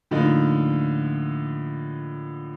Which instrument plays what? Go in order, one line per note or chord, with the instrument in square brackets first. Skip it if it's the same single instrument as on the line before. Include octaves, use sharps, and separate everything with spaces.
[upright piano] A2 D3 F3 A#3 D#4